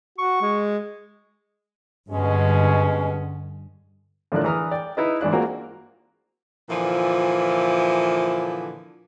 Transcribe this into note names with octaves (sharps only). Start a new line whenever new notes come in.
F#4 C#6
G#3
G2 B2 D3 G#3 C#4
A2 D3 F3 D4 A#4 F#6
E3 B4 A#5 D#6 F6
D5 G5
D#4 E4 B4 D#5
G#1 E3 D4 F#6
A#3 C4 F4 F#4 G#4 A#4
A#2 D3 E3 F3